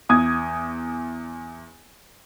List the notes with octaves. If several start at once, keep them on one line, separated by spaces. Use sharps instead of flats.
E2 D#6 G#6